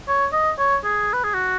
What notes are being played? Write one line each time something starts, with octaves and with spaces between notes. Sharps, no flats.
C#5
D#5
C#5
G#4
B4
G#4
F#4